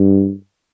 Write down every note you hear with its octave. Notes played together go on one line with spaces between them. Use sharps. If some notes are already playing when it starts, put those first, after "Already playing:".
Already playing: G2